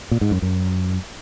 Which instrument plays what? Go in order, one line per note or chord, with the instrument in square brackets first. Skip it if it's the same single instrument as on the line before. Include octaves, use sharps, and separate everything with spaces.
[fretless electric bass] A#2
G#2
F#2
F#2